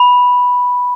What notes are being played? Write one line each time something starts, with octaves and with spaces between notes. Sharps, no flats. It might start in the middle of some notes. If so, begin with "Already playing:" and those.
Already playing: B5